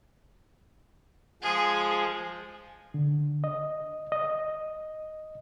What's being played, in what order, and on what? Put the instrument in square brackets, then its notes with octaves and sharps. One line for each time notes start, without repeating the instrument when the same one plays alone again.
[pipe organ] F3 G#3 [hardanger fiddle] G#4
[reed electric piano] D3
D#5
D#5